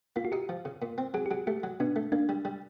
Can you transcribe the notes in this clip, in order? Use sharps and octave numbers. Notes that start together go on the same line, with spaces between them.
A#3 F4
F#4
D#4 G4
F3
C#3
A#2
C4
F#3 G#4
G4
F#3 G#4
A3 G4
F#3
B2 D4
A3
A#3 D4
G3
G3